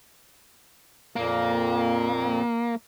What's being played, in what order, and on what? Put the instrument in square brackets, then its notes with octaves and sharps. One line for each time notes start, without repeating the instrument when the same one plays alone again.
[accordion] F2 A#2 [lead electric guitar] A#3